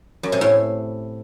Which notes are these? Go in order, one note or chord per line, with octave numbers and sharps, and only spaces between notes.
F#2
C3
A2